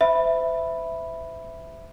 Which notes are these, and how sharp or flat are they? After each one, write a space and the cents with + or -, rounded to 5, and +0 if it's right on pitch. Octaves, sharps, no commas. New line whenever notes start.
C5 -40 E5 +0 B5 +0